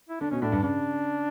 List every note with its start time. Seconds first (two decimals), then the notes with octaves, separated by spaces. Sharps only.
0.09 E4
0.21 D3 D4
0.31 B2 C#4
0.42 A2 D4
0.52 G2
0.62 C#3 D4